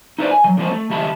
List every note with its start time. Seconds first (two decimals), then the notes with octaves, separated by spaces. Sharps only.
0.19 D#4 E4 B4 C5 D5
0.31 G#5
0.44 D#3 F#3
0.57 D3 E3 F3 G#3 C#4 C5
0.70 A3
0.90 C#2 D#3 G4 E5 A5 B5